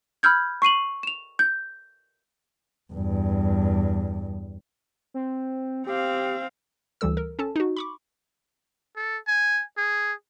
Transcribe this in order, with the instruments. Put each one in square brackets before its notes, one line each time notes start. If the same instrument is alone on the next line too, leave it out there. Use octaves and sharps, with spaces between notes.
[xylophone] B5 E6 F6 G6 G#6
C#6 C7 D#7 F#7
E7 F7
G6
[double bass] E2 G2
[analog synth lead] C4
[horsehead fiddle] C4 F5 [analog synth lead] G4
[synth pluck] D2 E3 G3 A4 E6
A#4
C#4 A4 A5
D#4 F#4
B5 C#6 D6
[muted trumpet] A4
G#5
G#4